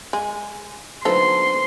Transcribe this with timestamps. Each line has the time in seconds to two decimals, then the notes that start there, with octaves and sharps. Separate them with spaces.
0.13 G#3 G#5
1.05 D3 F#3 B3 D#4 F4 A4 C5 C6